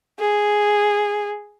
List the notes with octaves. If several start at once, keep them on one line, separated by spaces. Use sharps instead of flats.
G#4